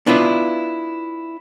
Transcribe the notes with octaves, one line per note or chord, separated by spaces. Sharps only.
B3 D4 E4 F4 B4